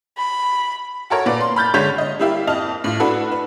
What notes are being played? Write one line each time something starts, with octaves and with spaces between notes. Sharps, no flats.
B5
F#4 A4 A#4 C#5
A#2 B4 D5
C6
B5 F6 G6 A6
D3 G#3 C#5 G6 B6 F7
D#5
G3 A#3 E4 G4 E5 F5
F2 D#5 A5 F6 F7
A2 F4
D4 E4 F#4 A4 B4
B4